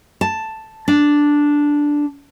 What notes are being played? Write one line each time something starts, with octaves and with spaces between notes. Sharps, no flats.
A5
D4